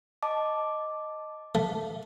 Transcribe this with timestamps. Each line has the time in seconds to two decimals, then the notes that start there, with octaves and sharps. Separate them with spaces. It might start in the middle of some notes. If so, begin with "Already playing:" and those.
0.23 D#5 A5 D6
1.55 A3